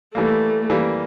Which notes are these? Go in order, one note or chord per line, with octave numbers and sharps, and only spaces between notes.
E3 G3 A3 A#3
E3 G3 A#3